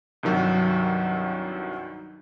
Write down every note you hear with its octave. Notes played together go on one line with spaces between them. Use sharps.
C2 G2 D#3 F#3